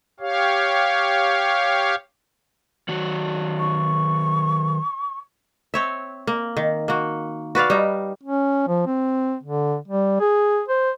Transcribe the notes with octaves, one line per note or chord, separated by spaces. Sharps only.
G4 C#5 F5
D#3 F#3 F#4
C#6
C4 C#5 E5
A#3
D#3
A#3 F#4
F#4 B4 D5 F5
G3 D#4
C#4
F3
C4
D3
G3
G#4
C5